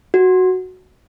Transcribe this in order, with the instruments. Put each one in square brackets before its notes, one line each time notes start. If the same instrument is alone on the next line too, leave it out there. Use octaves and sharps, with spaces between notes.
[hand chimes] F#4